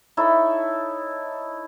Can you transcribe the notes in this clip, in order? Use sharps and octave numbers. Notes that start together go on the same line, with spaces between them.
D#4 E4 A4 C#5